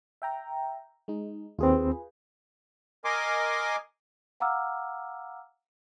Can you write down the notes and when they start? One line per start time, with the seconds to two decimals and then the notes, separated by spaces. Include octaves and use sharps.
0.22 E5 G5 A#5
1.08 G#3 D#4
1.59 D#2 C4 F4 G#4 B4
3.05 A#4 D#5 G#5 C6 D6
4.40 F5 F#5 A#5 D6 E6 F6